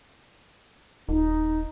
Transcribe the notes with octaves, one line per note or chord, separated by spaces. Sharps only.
D#1 D#4